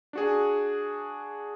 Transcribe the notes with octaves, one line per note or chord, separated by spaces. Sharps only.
D4 F#4 G#4